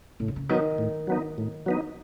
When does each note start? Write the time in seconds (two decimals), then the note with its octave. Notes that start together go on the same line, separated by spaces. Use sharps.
0.20 A2 C#3
0.28 D3
0.36 C#3
0.49 D#3 F#3 B3 D#4
0.78 A2
1.07 F#3 B3 D#4
1.38 A2
1.66 F#3 B3 D#4